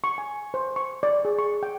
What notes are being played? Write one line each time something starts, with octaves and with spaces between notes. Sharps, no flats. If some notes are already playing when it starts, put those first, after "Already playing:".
C#6
G#5
C5
C#6
D5
G#4
C#6
G5